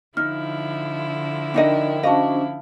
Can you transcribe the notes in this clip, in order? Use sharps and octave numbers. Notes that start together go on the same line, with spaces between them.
D3 F3 D#4 E4 F6
D4 D#4 A#4 D#5 G5
C#4 D4 F#4 C5 D#5 F5 A5